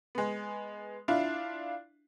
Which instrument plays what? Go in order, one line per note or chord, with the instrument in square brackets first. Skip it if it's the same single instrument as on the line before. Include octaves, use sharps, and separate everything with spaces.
[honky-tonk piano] G#3 B3
D4 E4 F4